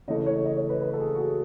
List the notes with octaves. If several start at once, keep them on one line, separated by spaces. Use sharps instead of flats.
C#3 E3 A3 D#5
C#5
D#5
C#5
B4
B4
A4
G#4
F#4
G#4